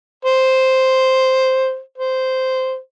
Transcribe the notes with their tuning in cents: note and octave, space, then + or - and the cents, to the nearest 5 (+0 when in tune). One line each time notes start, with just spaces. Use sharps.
C5 +0
C5 -10